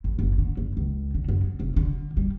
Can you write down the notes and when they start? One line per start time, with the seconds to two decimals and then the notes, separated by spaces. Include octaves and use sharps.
0.04 A1
0.19 F#1
0.38 D3
0.57 F#1
0.77 C#2
1.14 D3
1.28 F#2
1.44 C#3
1.60 F1
1.76 D3
2.17 G3